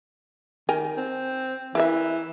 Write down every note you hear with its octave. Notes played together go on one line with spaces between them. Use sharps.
D#3 A#4 G5 G#5
C4
E3 E4 A#4 E5